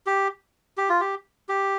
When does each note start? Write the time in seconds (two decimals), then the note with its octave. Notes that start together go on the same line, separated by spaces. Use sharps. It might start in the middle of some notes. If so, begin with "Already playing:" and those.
0.07 G4
0.78 G4
0.89 F4
1.01 G4
1.49 G4